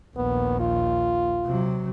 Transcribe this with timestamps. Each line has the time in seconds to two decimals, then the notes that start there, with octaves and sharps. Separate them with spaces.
0.16 A#1 D#2 B3
0.60 F4
1.45 C3 F#3